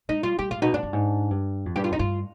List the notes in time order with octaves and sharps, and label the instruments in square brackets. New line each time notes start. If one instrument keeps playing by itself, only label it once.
[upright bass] G#3 [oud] D#4
[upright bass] G3 [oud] F4
[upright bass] G3 [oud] G4
[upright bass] G#2 [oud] F4
[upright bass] B2 [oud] D#4
[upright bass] G#2 [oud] D4
[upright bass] G2
G#2
G2
F2
[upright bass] G2 [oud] G4
[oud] F4
[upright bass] F2 [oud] D#4
[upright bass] G2 [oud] F4